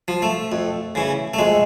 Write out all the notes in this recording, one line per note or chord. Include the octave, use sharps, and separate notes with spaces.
F3
A3
F2
C#3 E3
A3
F2 G#3